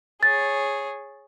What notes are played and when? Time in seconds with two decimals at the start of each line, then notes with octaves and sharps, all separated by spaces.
0.23 G#4 C#5 A6